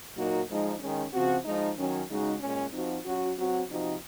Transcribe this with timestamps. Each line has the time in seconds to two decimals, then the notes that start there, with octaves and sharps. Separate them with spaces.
0.15 A#2 F#3 A#3 D#4 F#4
0.48 F3 G#3 D#4
0.79 D#3 G#3 C#4
1.11 C#3 F3 C4 F#4
1.44 F3 G#3 D#4
1.76 D#3 F#3 C#4
2.08 C#3 G#3 D#4 F#4
2.40 A#2 G#3 C#4
2.72 F3 C4 D#4 F#4
3.05 F#3 C#4 F#4
3.37 F#3 C4 F#4
3.69 C3 F3 C4 D#4 F#4